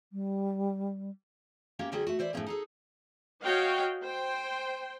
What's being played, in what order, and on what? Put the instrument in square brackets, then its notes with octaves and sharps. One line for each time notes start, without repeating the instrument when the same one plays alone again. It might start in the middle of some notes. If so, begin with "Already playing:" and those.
[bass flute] G3
[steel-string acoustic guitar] A#3 C#4 G4 E5
D3 F#3 G3 F#4 G#4
A3 F#4
E3 C5 D5 E5
A2 F3 G#3 A#3 C#4 G#4
D#4 G#4 A4
[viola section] F#4 C#5 D#5 F5 G5
C5 G5